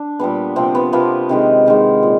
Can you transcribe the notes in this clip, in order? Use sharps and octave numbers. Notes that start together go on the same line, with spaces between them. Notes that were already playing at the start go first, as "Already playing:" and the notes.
Already playing: D4
A#2 G3 B3
C3 F3 A#3 C4
B3
C3 F3 A#3 B3
C3 D#3 G#3
C3 D#3 G#3
A#2